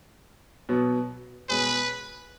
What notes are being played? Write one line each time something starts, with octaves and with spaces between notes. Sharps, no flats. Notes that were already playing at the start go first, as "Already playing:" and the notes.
B2 F#3 B3
B2 G#3 C#4 G#4 B4